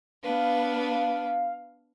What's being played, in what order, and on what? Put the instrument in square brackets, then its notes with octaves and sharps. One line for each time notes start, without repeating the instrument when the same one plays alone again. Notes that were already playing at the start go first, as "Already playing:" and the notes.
[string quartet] B3 D4 B4 [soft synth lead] F5